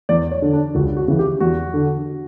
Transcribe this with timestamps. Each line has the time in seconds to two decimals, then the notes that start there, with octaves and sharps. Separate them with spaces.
0.09 E2 D5
0.31 C#5
0.42 D3
0.53 D4
0.75 C#2 F#4
0.97 F#4
1.08 C#3 E3
1.19 G4
1.40 E2 F#4
1.74 D3